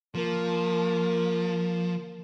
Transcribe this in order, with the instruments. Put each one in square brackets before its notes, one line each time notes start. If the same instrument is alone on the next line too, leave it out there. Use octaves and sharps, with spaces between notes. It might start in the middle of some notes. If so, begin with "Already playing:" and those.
[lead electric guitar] F3 [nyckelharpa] A#3